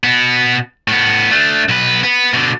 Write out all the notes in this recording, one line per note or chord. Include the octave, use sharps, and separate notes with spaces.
B2 B3
A2 B3
A3 D4
B1 B4
B3 B4
B2 D3